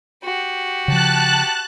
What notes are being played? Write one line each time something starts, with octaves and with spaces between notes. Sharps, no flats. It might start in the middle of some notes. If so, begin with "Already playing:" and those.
F#4 G4
C#3 F3 A5 F#6